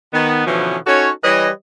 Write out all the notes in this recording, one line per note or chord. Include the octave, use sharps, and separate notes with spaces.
D#3 B3
B2 D3 E3 F3 B3 C#4
C#4 D#4 F#4 A4 C#5
E3 G3 B4 C#5 D#5